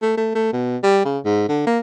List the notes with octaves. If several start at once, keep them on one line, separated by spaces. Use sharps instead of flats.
A3
A3
A3
B2
G3
C#3
G#2
D3
A#3